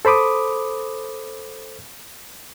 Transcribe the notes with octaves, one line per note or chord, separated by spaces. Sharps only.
A4 C5 B5 D6 D#6